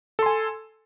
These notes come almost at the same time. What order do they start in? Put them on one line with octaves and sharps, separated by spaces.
A4 C6 G#5